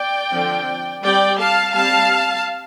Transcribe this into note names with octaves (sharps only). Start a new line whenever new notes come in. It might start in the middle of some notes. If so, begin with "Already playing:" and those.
Already playing: D5 G5
D3 F3 C4
G3 C4 D5 G5
F5 A5
G3 C4 F5 A5